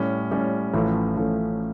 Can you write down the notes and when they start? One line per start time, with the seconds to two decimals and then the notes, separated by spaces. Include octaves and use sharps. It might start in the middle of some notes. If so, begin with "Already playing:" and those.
Already playing: A2 G3 C#4
0.31 A2 G3 C#4
0.74 A1 A2 F3 A3 C#4
1.17 A1 A2 F3 A3 C#4